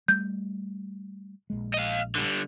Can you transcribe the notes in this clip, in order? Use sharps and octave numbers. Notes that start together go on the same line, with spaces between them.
G3 A3 G6
A#1 G#3
D#5 F5
D3 G3